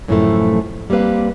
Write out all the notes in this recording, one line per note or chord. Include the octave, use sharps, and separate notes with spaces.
F#2 A2 C3 E3 F3 A3
G3 A#3 C4 B4 F5